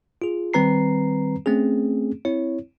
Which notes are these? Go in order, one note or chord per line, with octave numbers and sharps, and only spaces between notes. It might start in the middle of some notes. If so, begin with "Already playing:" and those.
F4 G#4
D#3 G3 C4 B4 A#5 C7
A3 C4 C#4 G#4
C4 E4 C#5